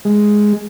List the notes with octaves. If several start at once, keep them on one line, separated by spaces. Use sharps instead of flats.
G#3